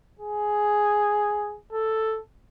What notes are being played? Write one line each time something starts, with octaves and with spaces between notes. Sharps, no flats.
G#4
A4